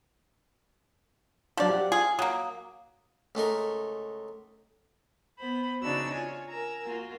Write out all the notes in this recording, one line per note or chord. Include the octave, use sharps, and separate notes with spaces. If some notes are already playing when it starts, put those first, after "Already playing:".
F3 F#3 D4 F4 D5
G4 F5 F#5
F4 G#4
F#3 A#3 D#6
C#2 A3 D#4 A#4
B3 C5 B5
C#3 D4 D#4 F#4 C#5 E6
F4 C#5 G#5
A#4 G#5 A#5 E6
A#3 F4 F#4